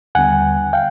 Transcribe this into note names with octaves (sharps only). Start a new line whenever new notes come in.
D#2 D3 G3 B3 F#5 G#5
F5 G5